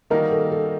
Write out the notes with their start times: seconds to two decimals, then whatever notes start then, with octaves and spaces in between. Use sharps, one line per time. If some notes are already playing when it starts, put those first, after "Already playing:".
0.10 D#3 G3 A#3 D#4 F#4 A#4
0.31 A4
0.52 A4